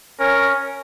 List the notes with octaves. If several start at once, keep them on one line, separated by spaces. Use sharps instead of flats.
C#4 A#4